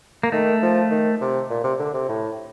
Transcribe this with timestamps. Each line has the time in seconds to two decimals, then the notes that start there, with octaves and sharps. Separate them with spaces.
0.23 A#3
0.32 D#3 A3
0.62 F3
0.91 D#3
1.21 C3
1.50 A#2
1.64 C3
1.79 D3
1.93 C3
2.09 A2